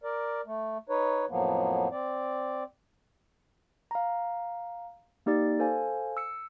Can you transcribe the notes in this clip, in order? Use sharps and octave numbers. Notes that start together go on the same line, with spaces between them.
A#4 D5
A3
D#4 B4 C#5
F2 A2 F3 F#3 A#3 B3
C4 D5
F5 A#5
A#3 D#4 G4 D5 A6
A4 C5 F5 G#5
E6 C#7